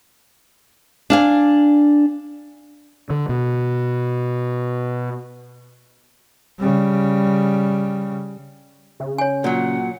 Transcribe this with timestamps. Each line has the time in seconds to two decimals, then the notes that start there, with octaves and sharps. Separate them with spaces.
1.10 D4 F5 G#5
3.10 D3
3.29 B2
6.59 C#3 G3
9.00 C#3
9.18 C#5 G#5
9.44 A#2 F#3 F#5